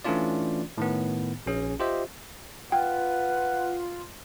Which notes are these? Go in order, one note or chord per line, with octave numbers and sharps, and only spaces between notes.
E3 A3 C#4 D4 F4 D5
A2 D#3 B3
A#1 C#4 G#4
F4 G4 C5 D#5 E5
F4 B4 F#5 G5